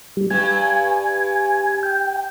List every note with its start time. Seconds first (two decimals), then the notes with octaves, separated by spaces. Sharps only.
0.17 G3
0.30 G2 G#5
1.83 G5